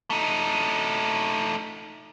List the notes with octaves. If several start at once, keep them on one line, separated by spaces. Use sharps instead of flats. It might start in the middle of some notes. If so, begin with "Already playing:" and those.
A3 D#4